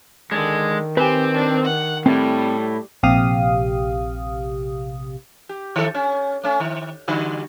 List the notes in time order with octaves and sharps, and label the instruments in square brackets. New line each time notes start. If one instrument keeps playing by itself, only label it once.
[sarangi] D3 [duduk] D#3 [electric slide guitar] G#3
[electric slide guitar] C4 [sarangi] G4 [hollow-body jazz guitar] B4 G#5
[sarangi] D4
F#5
[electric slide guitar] A2 [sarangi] G3 [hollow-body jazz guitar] C4
[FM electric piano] A#1 C3 G4 F5 D#6
[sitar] G4
D#3 A4
C#4
A3 C#4
D#3
D3 G3 F#4